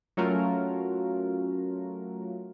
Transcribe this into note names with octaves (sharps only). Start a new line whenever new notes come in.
F#3 A3 C#4 F4 F#4 A#4